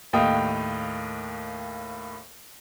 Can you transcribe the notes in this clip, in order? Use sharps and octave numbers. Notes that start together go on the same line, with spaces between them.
D#2 A2 D#5 F5 G5 D#6